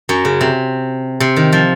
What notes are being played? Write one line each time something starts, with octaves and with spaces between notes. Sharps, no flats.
F#2 F#3
C#3
C3
C3
D#3
F3